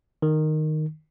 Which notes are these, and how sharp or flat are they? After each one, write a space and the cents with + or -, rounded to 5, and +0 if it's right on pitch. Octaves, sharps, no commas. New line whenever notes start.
D#3 -10